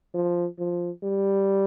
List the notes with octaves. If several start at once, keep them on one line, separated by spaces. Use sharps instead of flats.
F3
F3
G3